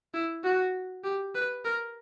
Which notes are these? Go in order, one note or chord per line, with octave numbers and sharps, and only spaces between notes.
E4
F#4
G4
B4
A#4